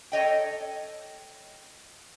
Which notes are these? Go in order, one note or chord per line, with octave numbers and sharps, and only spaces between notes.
A4 C#5 D#5 G5